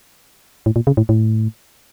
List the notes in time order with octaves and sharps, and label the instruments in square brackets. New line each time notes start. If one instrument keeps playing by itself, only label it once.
[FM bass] A2
A#2
C#3
A2
A2